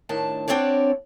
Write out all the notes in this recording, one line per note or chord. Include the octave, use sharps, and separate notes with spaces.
A2 D#3 D4 A5
C4 D4 F#4 C#5 D5